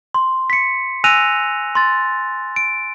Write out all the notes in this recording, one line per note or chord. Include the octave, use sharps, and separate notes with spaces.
C6
B6 C#7
G#5 E6 F#6 A#6 D#7 F7
C6 A6
D7